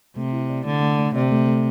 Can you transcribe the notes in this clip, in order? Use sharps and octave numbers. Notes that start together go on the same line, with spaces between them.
C3 A3
E4
D5
D3 A3
A3
A3
C3 D5
A3
A3